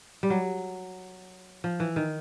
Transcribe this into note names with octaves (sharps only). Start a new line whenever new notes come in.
G3
F#3
F3
E3
D#3